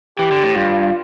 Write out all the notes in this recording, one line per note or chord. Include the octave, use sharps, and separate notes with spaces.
E3 G4
D3
A2
G2 F4